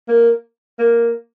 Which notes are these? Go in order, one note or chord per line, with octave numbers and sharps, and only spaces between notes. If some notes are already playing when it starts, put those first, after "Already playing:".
A#3
A#3